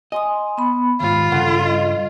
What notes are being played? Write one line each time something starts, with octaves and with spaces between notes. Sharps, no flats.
D#5 G#5 C6 D#6
B3 B5
D#2 G#2 F4 B5
G2 C#3 A4 F#5
G3 D#5